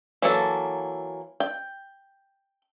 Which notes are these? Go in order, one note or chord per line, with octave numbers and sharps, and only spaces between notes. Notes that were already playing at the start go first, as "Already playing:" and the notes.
E3 F#3 A#3 A4
G5